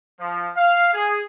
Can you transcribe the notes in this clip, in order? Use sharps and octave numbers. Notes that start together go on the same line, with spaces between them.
F3
F5
G#4